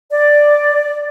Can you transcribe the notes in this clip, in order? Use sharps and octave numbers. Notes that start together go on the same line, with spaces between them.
D5